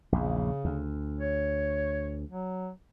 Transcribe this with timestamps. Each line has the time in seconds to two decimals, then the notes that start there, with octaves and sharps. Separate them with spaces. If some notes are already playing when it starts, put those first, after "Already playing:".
0.12 A#1 E2 C#3
0.65 D2
1.20 C#5
2.30 F#3